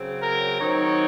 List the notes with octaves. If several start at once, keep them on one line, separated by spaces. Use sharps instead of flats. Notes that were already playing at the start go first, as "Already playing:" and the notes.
Already playing: C#3 F#3 C4
A#4
D#3 F#3 C4 D#4 C#5